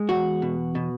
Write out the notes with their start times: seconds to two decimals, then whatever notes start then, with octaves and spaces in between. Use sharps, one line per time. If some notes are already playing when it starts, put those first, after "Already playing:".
Already playing: G#3
0.09 E2 F#4
0.42 B2
0.75 B2